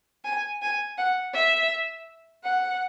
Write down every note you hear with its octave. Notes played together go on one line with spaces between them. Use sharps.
G#5
G#5
F#5
E5
F#5